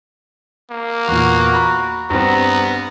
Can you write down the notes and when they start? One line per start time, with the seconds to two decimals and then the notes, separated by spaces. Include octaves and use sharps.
0.70 A#3
1.08 E2 A#2 F#4
1.53 A#5 B5
2.10 G2 B3 C4 A#5